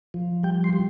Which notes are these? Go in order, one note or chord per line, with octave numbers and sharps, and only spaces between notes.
F3
G3 G5
C6
G3